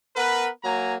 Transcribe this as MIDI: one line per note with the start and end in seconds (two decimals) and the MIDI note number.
0.16 0.47 59
0.16 0.47 70
0.16 0.47 71
0.63 0.95 54
0.63 0.95 58
0.63 0.95 80
0.63 0.95 82